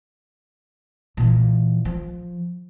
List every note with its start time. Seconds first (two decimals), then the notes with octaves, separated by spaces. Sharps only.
1.17 A#2 E3
1.85 F3